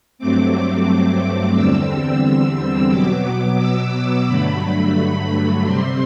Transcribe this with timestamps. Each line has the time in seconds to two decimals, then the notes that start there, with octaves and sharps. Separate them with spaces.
0.18 G2 F#3 A3 C4 D6
1.54 E2 D3 G3 C4 E6
1.88 E6
2.90 B2 F#3 B3 D6
3.25 D6
3.59 E6
3.92 D6
4.26 G2 D3 F#3 A3 B5
5.63 C3 G3 C4 C6